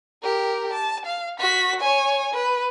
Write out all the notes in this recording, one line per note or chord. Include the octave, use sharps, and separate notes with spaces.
G4 A#4
A5
F5
F#4 B6
C#5 G#5
B4